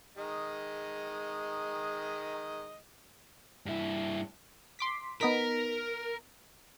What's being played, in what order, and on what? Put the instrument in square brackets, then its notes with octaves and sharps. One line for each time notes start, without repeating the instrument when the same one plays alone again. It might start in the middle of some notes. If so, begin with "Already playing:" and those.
[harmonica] D#3 G#3 D#5
[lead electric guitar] G2 E4
[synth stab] C6 D6 B6
[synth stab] B3 D#4 B6 [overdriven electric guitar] A#4